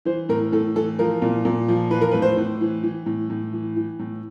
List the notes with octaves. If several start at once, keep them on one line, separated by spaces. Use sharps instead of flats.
E3 C5
A2 A#4
A2 A4
E3 A4
F3 A#4
A#2
A#2
F3
E3 B4
A#4
B4
A2
C5
A2
E3
E3
A2
A2
E3
E3
A2